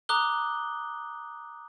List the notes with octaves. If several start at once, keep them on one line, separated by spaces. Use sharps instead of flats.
A#5 D6 D#6 F#6 G7